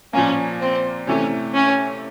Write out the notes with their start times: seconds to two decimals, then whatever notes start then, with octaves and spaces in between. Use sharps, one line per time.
0.13 A#2 F3 A#3 C#4
0.60 C4
1.07 C3 E3 A3 C#4
1.55 C#4